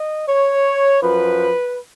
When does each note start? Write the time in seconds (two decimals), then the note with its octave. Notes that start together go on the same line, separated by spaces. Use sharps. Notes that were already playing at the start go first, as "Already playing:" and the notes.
Already playing: D#5
0.27 C#5
0.99 F#2 F3 B4